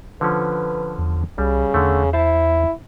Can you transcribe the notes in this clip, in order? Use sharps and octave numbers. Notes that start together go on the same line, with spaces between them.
D3 F3 C#4 B4
E2
C2 C#3 G3
E2 D3 A3
E4 C5 A5